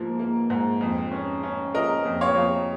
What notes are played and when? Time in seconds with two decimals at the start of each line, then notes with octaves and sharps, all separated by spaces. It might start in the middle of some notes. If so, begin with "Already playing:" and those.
Already playing: G#2 F3 A#3
0.19 A#3
0.50 G#2
0.81 F2
1.11 C#4
1.43 C#4
1.74 F3 A#4 D#5
2.05 F2
2.21 C#5 F5
2.36 F2